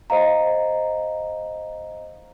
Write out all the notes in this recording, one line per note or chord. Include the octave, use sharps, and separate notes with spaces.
C5 D#5 F5 A#5